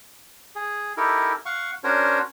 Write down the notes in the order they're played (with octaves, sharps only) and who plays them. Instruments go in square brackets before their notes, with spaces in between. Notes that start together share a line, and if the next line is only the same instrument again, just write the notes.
[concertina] G#4
D#4 E4 G4 A4 A#4
F5 F#5 C#6
C#4 D4 F#4 A#4 C5 C#5